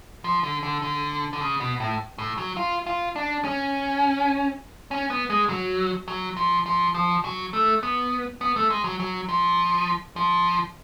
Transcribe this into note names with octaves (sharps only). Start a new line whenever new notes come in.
F3
D3
D3
D3
D3
C#3
B2
A2
A2
F#3
F4
F4
D4
C#4
C#4
B3
G#3
F#3
F#3
F3
F3
F3
F#3
A3
B3
B3
A3
G#3
F#3
F#3
F3
F3